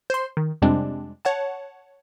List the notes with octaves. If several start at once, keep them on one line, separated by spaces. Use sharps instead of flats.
C5 C6
D#3
F2 C3 G3 G#3 C4 D4
C#5 F#5 A5